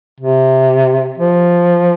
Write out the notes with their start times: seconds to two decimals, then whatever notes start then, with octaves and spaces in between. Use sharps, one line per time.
0.20 C3
1.17 F3